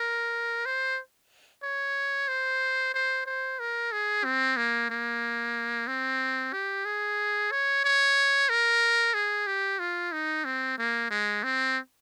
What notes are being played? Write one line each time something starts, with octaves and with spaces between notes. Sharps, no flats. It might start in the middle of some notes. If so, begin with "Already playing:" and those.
Already playing: A#4
C5
C#5
C5
C5
C5
A#4
G#4
C4
A#3
A#3
C4
G4
G#4
C#5
C#5
A#4
G#4
G4
F4
D#4
C4
A#3
G#3
C4